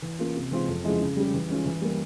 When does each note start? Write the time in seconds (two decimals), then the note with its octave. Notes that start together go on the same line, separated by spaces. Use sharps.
0.02 E3
0.19 A#3 C#4 F4
0.36 C3
0.51 E3 G#3 C4 F4
0.68 F2
0.84 C#3 F3 G#3 E4
1.01 C#3
1.16 G3 C#4 G4
1.34 E3
1.50 G#3 C#4 F4
1.66 E3
1.81 G3 A#3